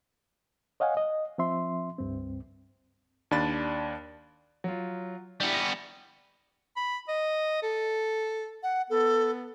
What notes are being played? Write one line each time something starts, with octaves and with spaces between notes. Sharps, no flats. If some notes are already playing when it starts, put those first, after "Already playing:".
C#5 D#5 F5 F#5 G#5
D#5
F3 C4 E5 C6
C#2 G2 C4
D#2 D4 D5 B5 A6
F#3 F4
G3 B3 D4 E4 G4
A#6
B5
D#5
A4
F#5
B3 A4